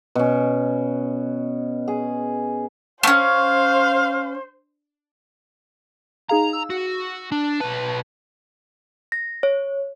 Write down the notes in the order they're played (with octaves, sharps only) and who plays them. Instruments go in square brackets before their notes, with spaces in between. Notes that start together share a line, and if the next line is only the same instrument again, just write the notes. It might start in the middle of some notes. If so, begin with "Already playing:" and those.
[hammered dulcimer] B2 C#4
G#4
[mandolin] A3 C#4 [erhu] C5 [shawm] F5
[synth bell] D#4 G#4 F5 [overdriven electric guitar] A#5
[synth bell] E6
[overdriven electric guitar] F#4
D4
[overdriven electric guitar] B1 B4 [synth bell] A5
[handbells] A#6
C#5